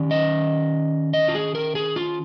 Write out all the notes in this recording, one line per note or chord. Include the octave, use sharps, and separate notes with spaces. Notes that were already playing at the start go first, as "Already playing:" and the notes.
Already playing: D#3 C#4
D#5
D#5
F4
G#4
A#4
G#4
F4